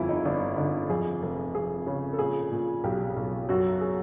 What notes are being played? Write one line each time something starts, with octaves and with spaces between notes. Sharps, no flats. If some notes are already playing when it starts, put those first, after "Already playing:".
Already playing: G1 F2 E4 F4 G#4
D#4
G1 D4
D3 D#4
F2 G#4
F1
F1 G#4
C#3
A4
A#2 G#4
A#2
B1 G4
B1
F#2 F#4
G#4